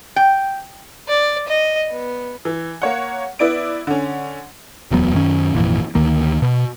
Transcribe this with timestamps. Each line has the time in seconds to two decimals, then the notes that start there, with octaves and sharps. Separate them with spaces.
0.16 G5
1.08 D5
1.48 D#5
1.90 B3
2.45 E3
2.82 A#3 C#5 F#5
3.39 B3 E4 D5 D7
3.87 D3 C#4
4.91 D1 E2 F#3 B3
5.13 F#2 D#3 C#4
5.53 G#1 F2 A#2 E3
5.95 D2 D#3 A#3
6.42 B2